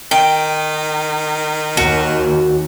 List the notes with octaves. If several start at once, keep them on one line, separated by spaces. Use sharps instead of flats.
D#3 G5
D#2 F#4